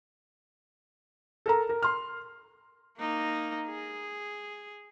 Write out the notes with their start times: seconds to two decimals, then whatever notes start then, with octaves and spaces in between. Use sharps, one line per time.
1.46 A4 A#4 A#5
1.69 A#4
1.82 C6 F6
2.99 A#3 D#4
3.67 G#4